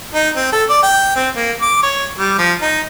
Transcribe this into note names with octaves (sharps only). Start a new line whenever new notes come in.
D#4
C4
A4
D5
G5
C4
A#3
D6
C#5
G3
F3
D#4